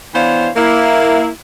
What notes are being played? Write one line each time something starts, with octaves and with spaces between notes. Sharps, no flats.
E3 B3 D4 C5 C#5 F5
A#3 E4